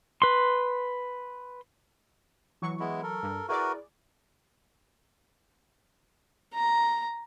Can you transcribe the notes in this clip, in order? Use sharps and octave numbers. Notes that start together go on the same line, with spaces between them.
B4 C6
E3 F#3 C#6
G#3 B3 E4
A4 A#4
G2
E4 F#4 G#4 A#4 B4 D5
A#5